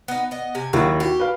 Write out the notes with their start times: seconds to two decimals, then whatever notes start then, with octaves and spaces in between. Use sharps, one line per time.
0.08 B3 D#4
0.31 B3 D#5
0.55 C3 G#5
0.73 D#2 F#3 E4
1.00 F#4 G4
1.20 B4 F5